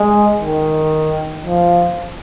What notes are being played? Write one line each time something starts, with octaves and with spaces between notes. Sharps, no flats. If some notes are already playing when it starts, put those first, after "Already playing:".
Already playing: G#3
D#3
F3